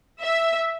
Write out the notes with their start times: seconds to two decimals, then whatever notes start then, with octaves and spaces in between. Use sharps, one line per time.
0.21 E5